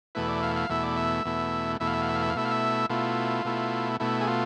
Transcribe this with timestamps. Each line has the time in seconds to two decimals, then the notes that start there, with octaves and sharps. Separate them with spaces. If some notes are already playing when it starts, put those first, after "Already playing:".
0.15 E2 B2 A3 E4 B4
0.28 D5
0.42 F5
0.56 F5
0.69 E2 B2 A3 E4 E5
0.83 D5
0.97 E5
1.25 E2 B2 A3 E4
1.80 E2 B2 A3 E4 E5
1.87 F5
1.94 E5
2.02 F5
2.09 E5
2.15 F5
2.22 E5
2.30 F5
2.35 B2 A3 E4 E5
2.45 F5
2.51 E5
2.89 B2 A3 E4 F4
3.45 B2 A3 E4
4.00 B2 A3 E4
4.21 G#4
4.27 F4